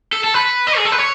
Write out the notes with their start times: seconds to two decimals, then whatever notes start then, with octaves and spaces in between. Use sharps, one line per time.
0.13 A4
0.24 A4
0.34 B4
0.67 D#5
0.77 G#4
0.85 A4
0.92 B4
0.99 C#5